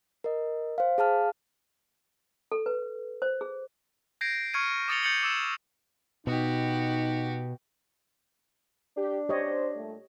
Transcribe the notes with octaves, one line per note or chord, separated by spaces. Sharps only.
A#4 D#5
C5 F5
G#4 F5 A5 F6
A4
B4
C5
G#4
G6 G#6 A#6 C7 D7
C#6 F6 G#6 C#7 D#7
D6 D#6 A6 C#7 F7 G7
G6 A6 C#7 F#7 G7
D6 E6 E7
B2 D#4 F#4 G4
D4 G4
G4 C5 C#5 D#5
A#2 G3 A3